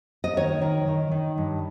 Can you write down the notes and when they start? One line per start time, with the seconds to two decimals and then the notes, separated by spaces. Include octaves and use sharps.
0.24 D#5
0.37 D#3 C#5
0.62 D#3
0.88 D#3
1.11 D#3
1.38 G2